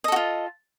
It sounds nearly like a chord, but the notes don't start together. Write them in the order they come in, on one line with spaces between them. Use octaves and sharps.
D#5 A4 F#4 F4